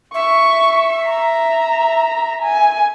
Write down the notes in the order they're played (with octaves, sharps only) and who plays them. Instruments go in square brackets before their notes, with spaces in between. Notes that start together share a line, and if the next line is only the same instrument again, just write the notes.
[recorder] E5 [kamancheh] C#6
[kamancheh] A#5
G#5